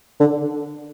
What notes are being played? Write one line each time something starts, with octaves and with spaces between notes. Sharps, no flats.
D3